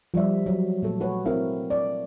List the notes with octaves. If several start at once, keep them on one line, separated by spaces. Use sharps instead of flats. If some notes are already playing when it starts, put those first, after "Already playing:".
F3 G3 D5 E5
F#3
A#2 A3 A4
A3 F#4 B4 C#5
C4 E4 A#4 E5 F5
D5